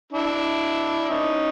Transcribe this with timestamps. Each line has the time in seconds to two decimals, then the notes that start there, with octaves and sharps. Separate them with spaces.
0.13 D4 E4
1.10 C#4 D#4